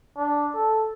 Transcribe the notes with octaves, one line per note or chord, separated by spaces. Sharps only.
D4
A4